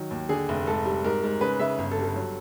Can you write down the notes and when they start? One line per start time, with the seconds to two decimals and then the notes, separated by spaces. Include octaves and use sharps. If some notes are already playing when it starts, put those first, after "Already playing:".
Already playing: D#3 F#3
0.11 D#2
0.29 D3 G#4
0.49 F1
0.66 G#2 A4
0.86 G3
1.04 G#2 A#4
1.23 G#2
1.41 C#3 B4
1.59 C#3 E5
1.78 G1
1.91 A4
1.98 G2
2.03 A4
2.16 F#3